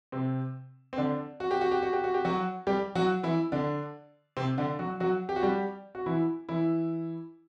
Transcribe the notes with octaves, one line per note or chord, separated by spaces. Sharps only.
C3 C4
C4
D3 D4
F#4
G4
F#4
G4
F#4
G4
F#4
G4
F#3 F#4
G3 G4
F#3 F#4
E3 E4
D3 D4
C3 C4
D3 D4
F#3 F#4
F#3 F#4
G4
F#4
G3 G4
F#4
E3 E4
E3 E4